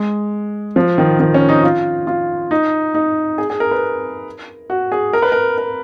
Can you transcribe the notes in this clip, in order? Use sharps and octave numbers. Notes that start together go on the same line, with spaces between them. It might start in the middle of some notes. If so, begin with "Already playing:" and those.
Already playing: G#3
F3
D#3
D#3
C#4
D#4
F4
F4
D#4
D#4
G#4
G#4
A#4
B4
F#4
G#4
A#4
B4
A#4
A#4